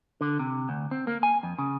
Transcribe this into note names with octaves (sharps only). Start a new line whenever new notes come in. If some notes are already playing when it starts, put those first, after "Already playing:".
D3
C3
D2
C4
A#3
G#5
F2
C#3